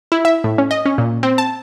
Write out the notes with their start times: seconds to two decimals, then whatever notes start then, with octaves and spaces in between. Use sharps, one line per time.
0.12 E4
0.25 E5
0.44 A2
0.58 C#4
0.71 D#5
0.86 C#4
0.98 A#2
1.23 C4
1.38 A5